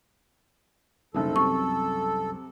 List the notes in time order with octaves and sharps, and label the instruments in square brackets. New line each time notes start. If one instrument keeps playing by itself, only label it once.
[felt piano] F#1 D#3 [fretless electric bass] C2 F#2 [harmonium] A4
[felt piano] C3 [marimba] C#6